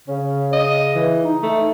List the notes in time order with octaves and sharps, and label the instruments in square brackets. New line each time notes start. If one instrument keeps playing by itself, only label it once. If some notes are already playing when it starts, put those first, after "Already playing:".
[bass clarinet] C#3 [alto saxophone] C#4
[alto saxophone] D#5
E3
[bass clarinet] D#4
[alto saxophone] A3